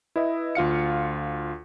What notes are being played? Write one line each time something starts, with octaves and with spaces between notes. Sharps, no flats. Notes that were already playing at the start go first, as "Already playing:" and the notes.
E4 B4 D#5 E5
D2 F4 F5 C#7